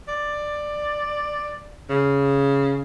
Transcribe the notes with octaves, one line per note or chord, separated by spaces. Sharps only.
D5
C#3